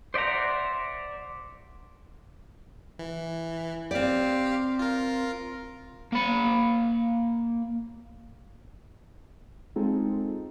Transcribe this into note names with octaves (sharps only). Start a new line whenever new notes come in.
C5 D5 E5 F#5 A#5
E3
C4 G4 D5 F5
F4 A#4
A#3 B5
G#3 C4 D#4 F4 G#4 A4